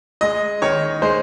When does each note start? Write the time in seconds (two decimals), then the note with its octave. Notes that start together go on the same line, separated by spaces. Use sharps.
0.21 G#3 D#5
0.62 D#3 C#5
1.02 G#3 C5